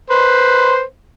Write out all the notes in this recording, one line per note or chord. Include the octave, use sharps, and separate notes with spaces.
B4 C5